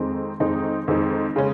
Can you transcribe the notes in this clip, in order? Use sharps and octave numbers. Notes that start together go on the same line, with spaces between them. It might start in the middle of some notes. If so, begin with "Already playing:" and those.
Already playing: F2 D#3 G#3 C4 D#4
F2 D#3 G#3 C4 D#4
F2 D#3 G#3 C4 D#4
C#3 G#3 C#4